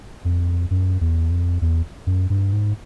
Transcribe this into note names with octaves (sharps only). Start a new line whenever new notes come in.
F2
F#2
E2
F2
E2
F#2
G2
G#2